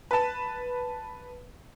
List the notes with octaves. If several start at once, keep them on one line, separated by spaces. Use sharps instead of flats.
B4 A5